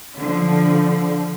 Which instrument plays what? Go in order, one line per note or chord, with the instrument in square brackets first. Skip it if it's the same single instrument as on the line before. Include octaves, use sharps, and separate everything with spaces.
[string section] D3 F3